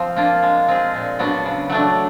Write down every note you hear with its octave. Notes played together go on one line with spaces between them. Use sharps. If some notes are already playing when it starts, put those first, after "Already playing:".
Already playing: F3 C4
A#3 D4 F4
G#3
C4 F4 G#4
A#2
F#3 B3 D4 F#4
C#3
F#3 A3 D4